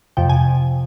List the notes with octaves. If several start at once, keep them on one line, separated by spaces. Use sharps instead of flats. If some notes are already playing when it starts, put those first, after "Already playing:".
F2 C3 F3 G5
G#5